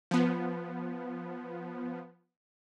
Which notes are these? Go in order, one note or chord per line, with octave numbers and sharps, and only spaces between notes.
F3 B3